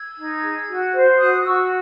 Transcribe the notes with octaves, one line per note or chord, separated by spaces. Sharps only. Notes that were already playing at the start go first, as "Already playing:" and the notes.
Already playing: E6 G#6
D#4
G#4
F#4
C5
F#4 D#6 F#6
F#4 C#6 E6